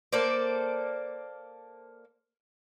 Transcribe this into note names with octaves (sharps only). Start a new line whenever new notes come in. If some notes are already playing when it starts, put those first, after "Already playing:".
A#3 A4 C5 D5